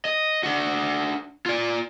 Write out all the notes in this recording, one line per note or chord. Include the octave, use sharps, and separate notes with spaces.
D#5
D4 F#4
F4 D5